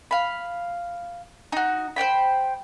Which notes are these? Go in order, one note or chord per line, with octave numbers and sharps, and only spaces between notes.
F5 B5
D#4 F#4
C5 C#5 G5 B5